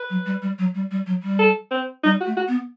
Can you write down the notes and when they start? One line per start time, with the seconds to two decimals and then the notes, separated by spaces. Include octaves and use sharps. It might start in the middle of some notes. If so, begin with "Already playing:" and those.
Already playing: B4
0.10 F#3
0.26 G3
0.42 G3
0.58 F#3
0.75 G3
0.91 G3
1.06 F#3
1.23 G3
1.39 A4
1.71 C4
2.04 G3 D#4
2.21 F#4
2.26 A3
2.37 F#4
2.48 B3